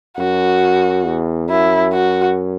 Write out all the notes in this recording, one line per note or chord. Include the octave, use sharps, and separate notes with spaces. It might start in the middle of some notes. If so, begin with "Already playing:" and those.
F#2 F#4
E2
F#2 E4
F#4